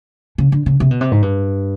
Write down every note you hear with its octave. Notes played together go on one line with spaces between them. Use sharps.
C#3
D3
C#3
C3
B2
C3
G#2
G2